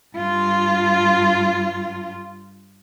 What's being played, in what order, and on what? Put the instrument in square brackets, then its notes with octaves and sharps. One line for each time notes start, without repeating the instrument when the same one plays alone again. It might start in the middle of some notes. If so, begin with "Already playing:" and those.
[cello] G2 F4